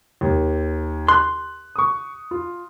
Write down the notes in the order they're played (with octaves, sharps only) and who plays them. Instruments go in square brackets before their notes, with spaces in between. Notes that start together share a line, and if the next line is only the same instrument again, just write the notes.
[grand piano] D#2
[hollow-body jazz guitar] C6 [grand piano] F#6
[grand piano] C#6 D#6
F4